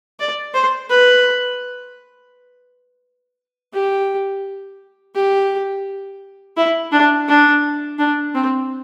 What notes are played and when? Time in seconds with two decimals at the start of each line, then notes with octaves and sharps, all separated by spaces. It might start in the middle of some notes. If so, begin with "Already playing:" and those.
0.20 D5
0.54 C5
0.90 B4
3.73 G4
5.15 G4
6.57 E4
6.92 D4
7.29 D4
7.99 D4
8.35 C4